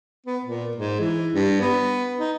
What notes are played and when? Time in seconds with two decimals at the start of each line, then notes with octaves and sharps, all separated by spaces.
0.26 B3
0.44 A#2
0.75 G#2
1.00 E3
1.32 G2
1.61 B3
2.19 D#4